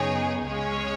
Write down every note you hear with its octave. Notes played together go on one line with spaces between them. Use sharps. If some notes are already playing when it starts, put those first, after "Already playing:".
Already playing: F#2 C#3 B3 D#4 G#4 C#5
C#2 C#3 G#3 C#4 G#4 C#5